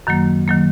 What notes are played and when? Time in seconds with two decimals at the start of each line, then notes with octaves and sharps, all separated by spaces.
0.07 F#2 D#3 F#3 A#3
0.48 D#3 F#3 A#3